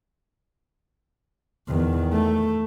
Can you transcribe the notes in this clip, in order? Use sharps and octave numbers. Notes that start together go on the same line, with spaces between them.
E2 D#3
A3